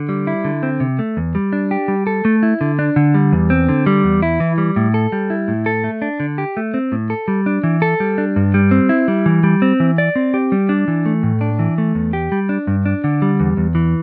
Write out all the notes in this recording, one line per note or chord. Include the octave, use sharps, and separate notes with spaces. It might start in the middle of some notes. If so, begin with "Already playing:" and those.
Already playing: D3
G3
E4
D3
C4
C3
A3
E2
G3
D4
G4
G3
A4
A3
E4
D3
D4
D3
G3
E2
C4
D3
G3
E2
E4
E3
G3
A2
A4
G3
E4
A2
A4
A3
D4
D3
G4
A3
C4
A2
A4
G3
D4
E3
A4
G3
D4
G2
G3
C4
E4
G3
E3
G3
C4
E3
D5
C4
G4
G3
D4
E3
A3
A2
D4
E3
A3
E2
G4
G3
D4
G2
D4
D3
G3
E2
E2
E3